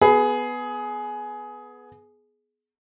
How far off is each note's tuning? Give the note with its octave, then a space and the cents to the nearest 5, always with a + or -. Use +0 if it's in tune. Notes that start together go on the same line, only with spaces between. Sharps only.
B3 +0 G#4 +20 B5 +15